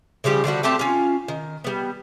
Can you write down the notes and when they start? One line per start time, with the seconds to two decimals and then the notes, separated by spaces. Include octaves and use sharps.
0.24 C#3 F3 G3 G4
0.44 D3 F3 G3 F#4
0.63 A3 C4 G4 A5
0.79 C#4 F4
1.28 D#3
1.64 G3 B3